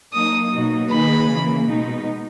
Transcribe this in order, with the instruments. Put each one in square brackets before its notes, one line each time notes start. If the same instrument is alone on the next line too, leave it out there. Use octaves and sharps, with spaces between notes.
[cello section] F#3 A#3 D#4 [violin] D#6
[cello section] B2 F#3 A#3 D#4 F#4
[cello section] D#3 A#3 D#4 G#4 B4 [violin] B5
[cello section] C#3 E3 A#3
B2 G#3 D#4